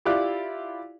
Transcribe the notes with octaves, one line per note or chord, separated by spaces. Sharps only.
E4 F4 G4 D5 F#6